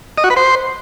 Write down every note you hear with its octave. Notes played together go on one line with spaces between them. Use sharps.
D#5
F#4
B4
C5